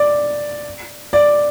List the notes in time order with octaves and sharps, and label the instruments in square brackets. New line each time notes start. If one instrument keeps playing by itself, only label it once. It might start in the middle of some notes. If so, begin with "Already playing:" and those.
Already playing: [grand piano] D5
D5